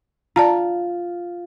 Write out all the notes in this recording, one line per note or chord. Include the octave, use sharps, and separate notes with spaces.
F4 D5 A5 A#5